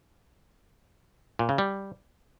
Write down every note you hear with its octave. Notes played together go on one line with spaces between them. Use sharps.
A#2
C#3
G3